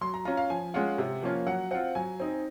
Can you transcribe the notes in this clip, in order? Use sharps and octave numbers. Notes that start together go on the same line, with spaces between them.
F#3 C6
A#5
C#4 F4 A#5
F5
F3 G#5
G#3 C#4 F4 F#5
C3
F3 A#3 C#4 F4
F#3 F#5
C4 F4 F#5
F#3 G#5
C4 D#4